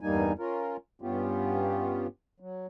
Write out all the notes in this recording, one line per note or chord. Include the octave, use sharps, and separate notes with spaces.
E2 G2 G3 A#3 D#4 G#5
C#4 F4 A#4
G2 B3 C#4 F4 G4
F#3